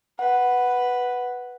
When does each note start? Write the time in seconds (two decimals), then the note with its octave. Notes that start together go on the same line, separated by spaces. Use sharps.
0.19 B4 F#5